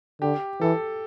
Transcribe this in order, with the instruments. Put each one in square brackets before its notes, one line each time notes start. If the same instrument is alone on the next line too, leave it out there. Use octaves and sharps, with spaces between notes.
[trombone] D3 [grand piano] G4
[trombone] E3 [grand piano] A4